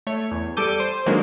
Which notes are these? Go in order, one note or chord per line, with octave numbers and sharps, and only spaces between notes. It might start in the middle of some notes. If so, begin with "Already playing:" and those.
A3 C#5
E2
G3 A4 D6 G6 D#7
C5
D3 D#3 F#3 G#3 A#3 C4